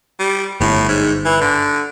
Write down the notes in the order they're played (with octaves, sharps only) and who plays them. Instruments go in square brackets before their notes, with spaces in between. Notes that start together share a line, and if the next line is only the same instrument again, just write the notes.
[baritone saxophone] G3
[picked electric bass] G1 [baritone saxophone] A2
[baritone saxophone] G#2
E3
D3